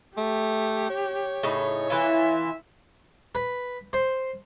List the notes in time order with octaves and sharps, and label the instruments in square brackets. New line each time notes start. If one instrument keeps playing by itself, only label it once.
[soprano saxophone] A3 [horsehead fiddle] G4
[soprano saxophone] C#5
[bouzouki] A2 C#3 D#4
[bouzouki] E3 E4 F4 [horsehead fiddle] E5
[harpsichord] B4
C5